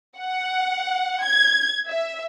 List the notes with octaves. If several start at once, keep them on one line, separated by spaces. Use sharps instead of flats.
F#5
G#6
E5